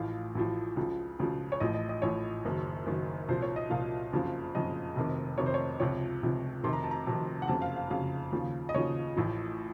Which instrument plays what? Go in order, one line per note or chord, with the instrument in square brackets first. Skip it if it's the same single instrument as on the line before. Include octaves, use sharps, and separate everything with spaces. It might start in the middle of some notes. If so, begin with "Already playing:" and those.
Already playing: [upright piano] A1 A2 F3 F5
A1 A2 F3
C#2 C#3 F3
C#2 C#3 F3
C#5
A1 A2 F3 D#5
D#5
D#5
A1 A2 F3 C#5
F#1 F#2 D#3
F#1 F#2 D#3
C2 A#2 F3 C5
C#5
D#5
C2 A#2 F3 F5
F#1 F2 C#3 F3
F#1 F2 C#3 F3 D#5
F1 F2 C3 D#3
F1 F2 C3 D#3 C#5
C5
C#5
C#2 C3 F3 C#5
C#2 C3 F3
F1 F2 C3 D#3 C6
A#5
A5
A#5
F1 F2 C3 D#3
F#5
F#1 F2 C#3 A5
F5
F5
F#1 F2 C#3 F5
D#2 C#3 F3
D#5
D#2 C#3 F3 C#5
A1 A2 F3